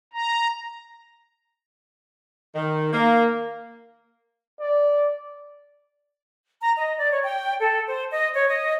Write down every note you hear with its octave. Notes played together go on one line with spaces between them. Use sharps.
A#5
D#3
A#3
D5
A#5
D#5
D5
C#5
G5
A4
C5
D#5
C#5
D#5